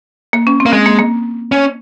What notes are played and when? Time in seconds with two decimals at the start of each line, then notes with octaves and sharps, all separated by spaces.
0.33 A#3
0.47 C#4
0.60 C4
0.66 A#3
0.73 G#3 C4
0.86 A#3
0.98 A#3
1.52 C#4